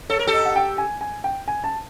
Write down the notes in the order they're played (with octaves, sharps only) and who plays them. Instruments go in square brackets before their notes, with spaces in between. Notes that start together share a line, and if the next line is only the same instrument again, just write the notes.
[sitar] A4 [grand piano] C#5
[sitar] A#4
G4 A4
[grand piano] D#5
F#5
G5
G#5
G#5
G5
G#5
A5